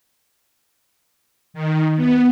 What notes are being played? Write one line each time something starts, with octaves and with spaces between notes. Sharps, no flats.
D#3
B3